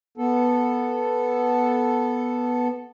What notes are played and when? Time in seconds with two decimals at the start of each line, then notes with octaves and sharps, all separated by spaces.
0.18 B3 A4